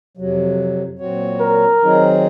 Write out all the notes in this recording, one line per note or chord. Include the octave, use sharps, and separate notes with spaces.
F2 C3 F#3
A#2 F#3 C4 F#4 C#5
A#4
D#3 F#3 C4 D#4 G#4